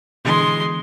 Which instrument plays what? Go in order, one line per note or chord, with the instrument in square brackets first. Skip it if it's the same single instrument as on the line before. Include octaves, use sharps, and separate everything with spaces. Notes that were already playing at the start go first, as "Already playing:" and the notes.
[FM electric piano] B2 D3 E3 [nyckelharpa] G#3 C6